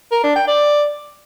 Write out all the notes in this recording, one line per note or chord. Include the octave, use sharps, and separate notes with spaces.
A#4
D4
G5
D5